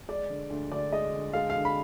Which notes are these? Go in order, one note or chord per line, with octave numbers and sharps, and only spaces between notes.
G#3 D5
D3
D2
D2 D5
G#3 D#5
D3
G#3 F5
F5
D3
B5